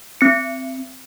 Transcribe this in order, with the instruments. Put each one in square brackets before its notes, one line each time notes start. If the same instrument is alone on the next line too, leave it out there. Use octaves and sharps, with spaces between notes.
[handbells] C4 C#7